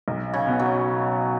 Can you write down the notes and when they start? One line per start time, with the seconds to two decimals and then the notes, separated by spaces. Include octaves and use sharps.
0.08 B1
0.34 C#3
0.47 B2 B3
0.59 F#3